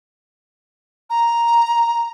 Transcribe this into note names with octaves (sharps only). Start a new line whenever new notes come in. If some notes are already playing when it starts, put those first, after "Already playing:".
A#5